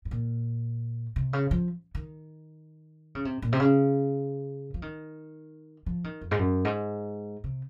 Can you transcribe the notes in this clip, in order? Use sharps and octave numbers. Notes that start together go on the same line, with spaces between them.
G#2
A#2
C3
C#3
F3
D#3
C#3
C3
A#2
C3
C#3
F3
D#3
F3
D#3
F2
G#2
F#2
G#2
C3